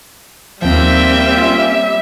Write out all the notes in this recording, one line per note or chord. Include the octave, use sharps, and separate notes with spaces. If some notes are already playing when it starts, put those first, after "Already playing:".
D#2 F3 G3 A#3 C4 E5 G5
C#4 F4